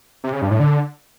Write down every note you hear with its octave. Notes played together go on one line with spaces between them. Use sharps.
C3
C#3
G2
A2
D3